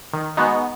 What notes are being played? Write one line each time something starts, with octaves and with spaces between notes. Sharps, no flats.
D#3
G#3 B3 D#4 F#4